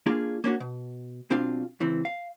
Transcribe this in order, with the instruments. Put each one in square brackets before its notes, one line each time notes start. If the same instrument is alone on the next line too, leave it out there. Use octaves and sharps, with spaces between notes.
[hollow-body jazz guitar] A#3 D4 F4 G#4
A#3 C#4 D4 F#4
B2
B1 C4 D4 F4 F5
C#2 E3 C4
F5